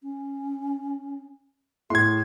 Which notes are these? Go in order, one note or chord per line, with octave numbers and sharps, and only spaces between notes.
C#4
A2 G#4 C6 G#6